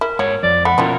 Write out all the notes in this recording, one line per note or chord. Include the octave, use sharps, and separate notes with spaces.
E4 A#4
G#2 F#4 C#5
F2 D5
A3 F#5 B5
B2 C4 C#4 E4 F4 A#4